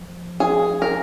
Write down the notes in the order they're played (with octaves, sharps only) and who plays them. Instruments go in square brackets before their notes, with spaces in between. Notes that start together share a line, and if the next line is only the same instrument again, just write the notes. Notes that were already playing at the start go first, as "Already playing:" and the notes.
Already playing: [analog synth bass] F3
[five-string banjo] G#4
A#4